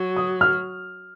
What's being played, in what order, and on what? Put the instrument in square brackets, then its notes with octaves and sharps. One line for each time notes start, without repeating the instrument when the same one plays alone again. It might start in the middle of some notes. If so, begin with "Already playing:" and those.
Already playing: [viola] F#3
[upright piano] D#6
F6